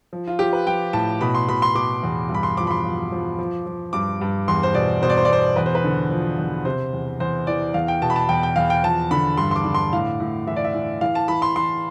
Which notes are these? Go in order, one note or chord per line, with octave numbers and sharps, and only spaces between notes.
F3
F4
F3 G4
B4
F3 G5
A2 A5
B2 B5
C6
B2 B5
C6
B2 D6
E2
G2
B5
C6
F3 D6
B5
C6
F3
F3
F3
F3
G2 D6
G2
E2 C6
C5
B2 D5
B2 C5
D5
C5
D5
B2 C5
E2 B4
C5
B4
D3
F3
E2
C3 C5
E2
E2 C5
E3 D5
E2 F5
G5
B2 A5
B5
A5
E2 G5
G5
E2 F5
G5
F3 A5
D3 B5
G2 C6
C6
D6
D3
C6
A2 F5
A2
E3 E5
D5
E5
E3
E3 F5
A5
E3 B5
C6
E3 C6